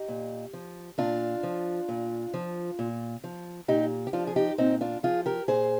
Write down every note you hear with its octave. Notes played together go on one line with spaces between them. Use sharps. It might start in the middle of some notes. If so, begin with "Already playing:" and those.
Already playing: D#4 G4
A#2
F3
A#2 D4 F4
F3
A#2
F3
A#2
F3
A#2 D#4 G4
G4
F3 D4 F4
G#4
D#4 G4
A#2 C4 D#4
D4 F4
F3 F4 G#4
G4 A#4
A#2 G#4 C5